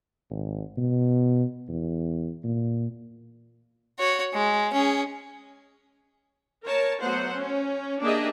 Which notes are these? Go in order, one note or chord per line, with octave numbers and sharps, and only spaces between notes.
G#1
B2
E2
A#2
F#4 C#5
G#3
C#4 G#4
A#4 C#5 A5
F#3 A3 B3 C5 F#5
C#4
A#3 D4 G4 G#4 D#5 E5